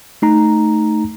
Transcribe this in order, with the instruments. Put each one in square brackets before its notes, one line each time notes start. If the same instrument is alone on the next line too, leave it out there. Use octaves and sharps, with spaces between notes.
[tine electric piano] A3 D#4 A#5